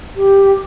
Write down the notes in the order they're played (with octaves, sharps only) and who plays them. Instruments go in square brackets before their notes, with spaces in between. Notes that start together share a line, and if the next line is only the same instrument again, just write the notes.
[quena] G4